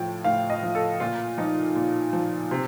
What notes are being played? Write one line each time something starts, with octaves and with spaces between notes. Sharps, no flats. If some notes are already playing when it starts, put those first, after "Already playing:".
Already playing: A2 F3 G5
A2 F5
D#5
F3
A4
A#2 F4
F3 D#4
A#2
F3
C3